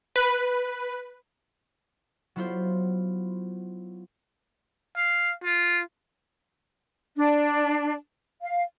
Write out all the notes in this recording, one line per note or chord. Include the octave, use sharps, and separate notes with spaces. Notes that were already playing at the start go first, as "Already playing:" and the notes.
B4
F#3 B3 E4 F4 B4 C5
F5
F4
D4
F5